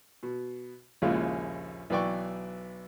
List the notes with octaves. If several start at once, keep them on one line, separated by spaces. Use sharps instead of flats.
B2
A#1 D#2 C#3 G#3 E4 F4
B1 E3 B4 D5 G5 C#6